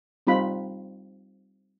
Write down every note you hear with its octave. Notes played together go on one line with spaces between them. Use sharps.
G3 C4 D#4 F4 B5